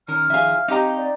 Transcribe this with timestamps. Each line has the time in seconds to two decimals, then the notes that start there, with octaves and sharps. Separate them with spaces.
0.08 D#3 C#4 A#4 F6
0.30 D#3 F3 G#4 E5 F5
0.68 C4 D#4 G4 D#5 F5 A#5
0.97 D5